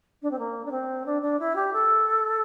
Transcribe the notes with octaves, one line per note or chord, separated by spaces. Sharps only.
D4
C4
A#3
D4
C4
D4
D4
E4
G4
A4